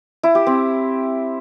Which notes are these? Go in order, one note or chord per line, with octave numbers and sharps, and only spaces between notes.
E4
G4
C4